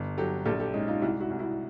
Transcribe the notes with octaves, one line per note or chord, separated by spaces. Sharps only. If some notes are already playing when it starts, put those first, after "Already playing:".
Already playing: G1
F#3 G4 A4
A#1 G4 A4
G4 A4
G#3 C#4 D#4
D#4 F4
C2 E4 F#4
E4 F#4
C2
E4 F#4